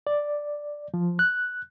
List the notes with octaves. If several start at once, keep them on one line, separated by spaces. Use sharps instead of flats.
D5
F3
F#6